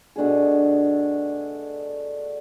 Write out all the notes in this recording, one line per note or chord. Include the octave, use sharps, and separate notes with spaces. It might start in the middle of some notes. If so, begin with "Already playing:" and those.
B2 A3 D4 G#4